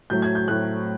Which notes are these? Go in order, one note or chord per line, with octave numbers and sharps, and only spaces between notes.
A2 F#3 A3 G6
G#6
G6
A2 F#3 A3 F#6